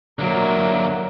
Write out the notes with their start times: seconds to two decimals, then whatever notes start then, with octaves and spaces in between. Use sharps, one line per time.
0.19 D3 F#3 A#3 A#4 E5